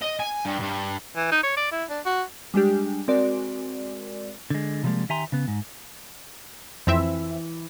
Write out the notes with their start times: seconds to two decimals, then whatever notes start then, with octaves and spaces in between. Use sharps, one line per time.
0.01 D#5
0.20 G#5
0.46 G2
0.60 G2
1.16 E3
1.32 D#4
1.43 C#5
1.57 D5
1.72 E4
1.90 D4
2.05 F#4
2.54 G3 G#3 D4 G4
3.08 G#3 C4 F#4 A#4 D5
4.50 D3 G#3
4.83 C3 E3 F3 G3 G#3 A#3
5.09 D#3 G4 E5 G#5 A#5 C6
5.32 C#3 B3
5.48 G#2
6.87 F2 E3 C4 E5